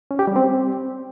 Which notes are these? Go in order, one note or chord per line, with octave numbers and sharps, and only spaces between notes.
C#4
G4
G3
C4